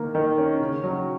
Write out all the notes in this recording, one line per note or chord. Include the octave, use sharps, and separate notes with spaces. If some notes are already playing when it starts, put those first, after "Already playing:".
Already playing: D#3 A#3
D#3
C#4
C#3
F#3